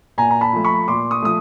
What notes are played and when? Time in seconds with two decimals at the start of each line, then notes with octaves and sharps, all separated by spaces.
0.18 A#2 G#5 A#5
0.31 A#5
0.41 A5 B5
0.53 F3 A3
0.64 B5 C#6
0.88 A#2 C6 D6
1.11 C#6 D#6
1.22 F3 A3 D#6